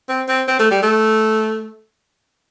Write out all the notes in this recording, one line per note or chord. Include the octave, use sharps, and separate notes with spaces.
C4
C4
C4
A3
G3
A3